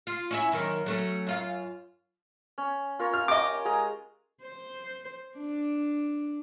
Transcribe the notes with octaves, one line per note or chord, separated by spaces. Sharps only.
F4
C#4 E4 E5
F#2 D#3 A#3
F#3 A3 C#4
F#2 F4 F5
C#4
F4 A#4 C#5
F6
G4 D#5 D6
G#3 G#4 A#5
C5
D4